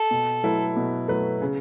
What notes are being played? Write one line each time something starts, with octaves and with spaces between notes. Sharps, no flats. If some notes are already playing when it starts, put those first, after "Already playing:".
Already playing: A4
B2
F#3 A3 E4 B4
B2
F#3 A3 E4 B4
C#3